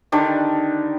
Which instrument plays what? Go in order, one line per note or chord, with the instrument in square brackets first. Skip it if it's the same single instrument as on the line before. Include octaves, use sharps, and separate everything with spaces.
[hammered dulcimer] D3 D#3 D4 G4